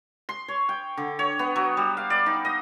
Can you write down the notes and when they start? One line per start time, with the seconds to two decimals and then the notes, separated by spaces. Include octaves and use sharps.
0.29 C6
0.48 C#5
0.69 G5
0.97 D3
1.19 C#5
1.39 B3
1.56 F#3
1.77 G3
1.97 F5
2.10 D5
2.26 D#4
2.45 D#5